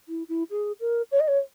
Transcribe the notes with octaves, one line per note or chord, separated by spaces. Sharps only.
E4
E4
G#4
A#4
C#5
D#5
C#5